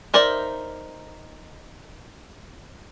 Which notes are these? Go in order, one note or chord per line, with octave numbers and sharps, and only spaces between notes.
D#4 A#4 C5 D5 E5